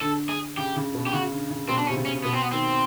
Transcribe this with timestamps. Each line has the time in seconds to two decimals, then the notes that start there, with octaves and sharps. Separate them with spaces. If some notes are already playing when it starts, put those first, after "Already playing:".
0.01 D3 A4
0.29 G#4
0.57 C#3 G4
0.76 C#3
0.94 B2
1.07 G4
1.13 C#3 F#4
1.32 D3
1.50 C#3
1.68 B2 C4
1.78 D4
1.87 C#4
1.89 C3
1.96 C#3
2.06 C#4
2.24 B2 B3
2.33 C4
2.42 B3
2.52 D#3 C4